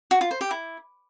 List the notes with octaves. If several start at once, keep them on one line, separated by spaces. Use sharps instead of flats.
F#4
F4
C5
G4
E4